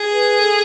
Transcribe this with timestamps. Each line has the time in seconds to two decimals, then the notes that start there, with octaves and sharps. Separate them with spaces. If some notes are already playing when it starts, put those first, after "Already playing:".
Already playing: G#4
0.12 B4
0.40 A4